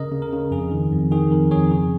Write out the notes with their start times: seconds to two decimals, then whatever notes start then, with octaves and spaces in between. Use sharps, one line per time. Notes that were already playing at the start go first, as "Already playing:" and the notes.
Already playing: C#3 A#4 D#5
0.12 C#3
0.22 A#4
0.32 C#3
0.51 F2 G#4
0.71 D#3
0.92 F2
1.11 D#3 G#4
1.31 F2 A#4
1.51 F2 G#4 C#5
1.71 C#3 G#4